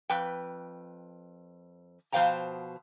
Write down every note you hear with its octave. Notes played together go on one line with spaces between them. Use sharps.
F2 B4 G5
B2 F3 C5 F5 G5 A#5